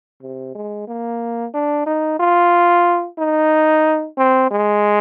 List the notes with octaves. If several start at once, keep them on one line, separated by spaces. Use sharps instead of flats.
C3
G#3
A#3
D4
D#4
F4
D#4
C4
G#3